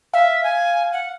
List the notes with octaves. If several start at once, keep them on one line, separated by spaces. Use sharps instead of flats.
E5 F5
G#5
F#5